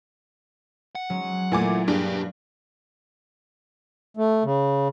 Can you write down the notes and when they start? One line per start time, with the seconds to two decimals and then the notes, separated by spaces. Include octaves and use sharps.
0.95 F#5
1.10 F#3 G#3 C#4
1.52 A#2 E3 A3 A#3 G#5 D6
1.88 B1 G2 A#3 D4 G4 G#4
4.17 A3
4.44 C#3